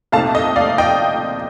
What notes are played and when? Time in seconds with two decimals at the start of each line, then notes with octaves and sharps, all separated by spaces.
0.12 C2 A#2 A3 C4 D#4 F5 A5
0.35 D#5
0.56 D5 F5
0.78 D#5 G5